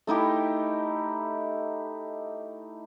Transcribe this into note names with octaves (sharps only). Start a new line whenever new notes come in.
A3 D#4 E4 G4